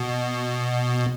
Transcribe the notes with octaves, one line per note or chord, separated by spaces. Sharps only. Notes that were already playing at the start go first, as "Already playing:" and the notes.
Already playing: B2